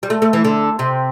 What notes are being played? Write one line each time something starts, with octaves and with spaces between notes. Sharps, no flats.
G3
A3
A3
E3
D3
C3